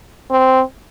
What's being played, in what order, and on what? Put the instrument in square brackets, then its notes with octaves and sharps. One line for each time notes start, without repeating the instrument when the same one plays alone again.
[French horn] C4